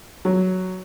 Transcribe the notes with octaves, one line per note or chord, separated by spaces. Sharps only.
F#3